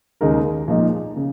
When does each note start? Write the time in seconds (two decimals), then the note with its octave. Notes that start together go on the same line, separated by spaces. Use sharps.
0.21 D#2 C#3 G#3 D#4 A#4
0.68 A#2 F3 G#3 D#4
1.17 C#3